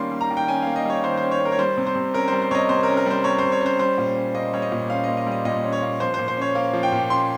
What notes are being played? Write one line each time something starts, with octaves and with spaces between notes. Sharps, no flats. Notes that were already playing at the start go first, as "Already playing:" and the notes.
Already playing: D#3 G3 A#3 C#4 C6
G3
A#5
D#3
G5
C#4 G#5
A#3 F5
D#5
G3 C#5
D#3 C5
C#4 C5
C#5
A#3 A#4
C#5
G3 C5
C3
C5
C3
C#4 A#4
C5
G3
C5
C3 C#5 D#5
C3 C5
C#4 A#4
A#4
G3 C5
C3 C#5
C3 C5
C#5
C#4 C5
G3 C5
A#2
C#4
A#3 D#5
G3 C#5
D#5
A#2
C#4 F5
A#3 D#5
D#5
G3
D#5
A#2 D#5
C#4
C#5
A#3
F3 C5
C5
A#2
C5
C#4 C#5
A#3 F5
F3
G5
A#2
C#4 C6